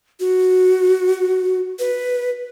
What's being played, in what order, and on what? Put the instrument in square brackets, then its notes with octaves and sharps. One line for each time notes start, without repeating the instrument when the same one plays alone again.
[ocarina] F#4
B4